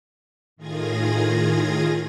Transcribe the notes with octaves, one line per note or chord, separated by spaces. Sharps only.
A2 D#3 F4 G#4 G#6 A#6